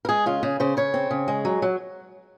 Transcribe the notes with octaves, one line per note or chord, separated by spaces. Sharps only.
A#4
G#3 G#4
C#3 F4
C#3 G#4
C#3 C5
C#3 C#5
C4
C#3
G#3
F#3
F#3